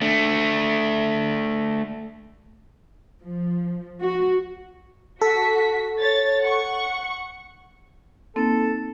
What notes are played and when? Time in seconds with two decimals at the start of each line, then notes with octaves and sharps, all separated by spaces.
0.01 A3 D4
3.22 F3
4.00 F#4
5.21 F#4 A4 B6
5.99 C#5 A6
6.41 F#5 C#6
8.36 A#3 C4 D#4 A4